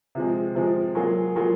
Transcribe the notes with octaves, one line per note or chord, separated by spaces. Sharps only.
C3 F3 G#3
C3 F3 G#3
F#3 A#3 F4 G#4
F#3 A#3 F4 G#4